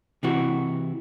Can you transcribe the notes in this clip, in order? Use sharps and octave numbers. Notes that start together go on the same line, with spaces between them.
C3 E3 F#4